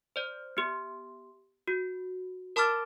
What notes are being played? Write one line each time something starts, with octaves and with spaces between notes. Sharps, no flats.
C5 D5
B3 G4
F#4
A#4 A5 B5 D6 F6 A6